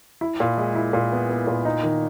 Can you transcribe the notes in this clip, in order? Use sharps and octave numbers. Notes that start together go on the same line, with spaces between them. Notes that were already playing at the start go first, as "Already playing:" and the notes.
E4
A#2
G#3
E4
A#2
B3
B3
A#2
D#4
D#3